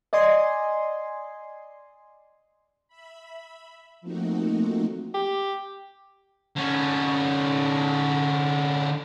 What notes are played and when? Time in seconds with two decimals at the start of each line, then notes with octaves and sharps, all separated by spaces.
0.13 D5 D#5 G#5 C6
2.88 E5 B5
4.01 F3 A3 A#3 C4 D#4 F#4
5.14 G4
6.56 D3 C#4